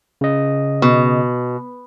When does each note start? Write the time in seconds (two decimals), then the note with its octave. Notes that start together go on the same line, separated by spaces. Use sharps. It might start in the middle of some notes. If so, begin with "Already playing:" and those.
0.21 C#3 D#5
0.82 B2